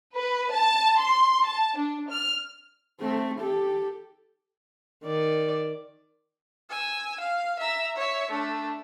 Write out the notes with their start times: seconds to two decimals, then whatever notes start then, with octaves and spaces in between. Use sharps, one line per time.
0.16 B4
0.52 A5
1.00 C6
1.45 A5
1.77 D4
2.10 F6
3.00 A3 C4
3.40 G4 A4
5.04 D#3 D5
6.70 G#5 E6
7.20 F5
7.59 E5 A#5
7.96 C#5 E5
8.31 A3 D4